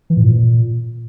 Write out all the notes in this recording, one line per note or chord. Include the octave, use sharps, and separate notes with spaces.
E3
A2
A#2